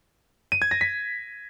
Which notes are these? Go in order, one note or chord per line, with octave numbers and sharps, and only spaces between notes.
D#7
G#6
A#6
B6